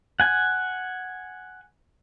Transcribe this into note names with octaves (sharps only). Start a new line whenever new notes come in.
F#5 G#5